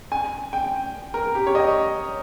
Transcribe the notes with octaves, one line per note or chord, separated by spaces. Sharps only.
G#5
G5
A#4
G4
C#5
D#5